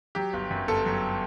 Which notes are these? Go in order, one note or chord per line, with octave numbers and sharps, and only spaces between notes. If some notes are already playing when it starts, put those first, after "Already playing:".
F#3 G4
G1
F#2
G1 A4
F#3